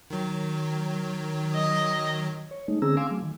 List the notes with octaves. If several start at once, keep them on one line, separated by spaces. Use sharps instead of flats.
D#3 F#3
D#5
C#5
G#3 A3 D#4
D3 C4 C#4 G#4 A#5 E6
F5 G#5 C6 D6 E6
F#3 A3
D#3